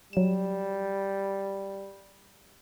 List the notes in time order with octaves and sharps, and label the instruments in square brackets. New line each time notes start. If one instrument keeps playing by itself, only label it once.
[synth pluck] F#3 E7 [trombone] G3